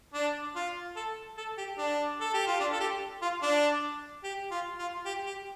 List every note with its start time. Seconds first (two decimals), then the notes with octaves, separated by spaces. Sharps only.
0.14 D4
0.55 F4
0.96 A4
1.37 A4
1.58 G4
1.78 D4
2.20 A4
2.34 G4
2.47 F4
2.60 D4
2.72 A4
2.80 G4
3.22 F4
3.42 D4
4.24 G4
4.51 F4
4.78 F4
5.05 G4
5.26 G4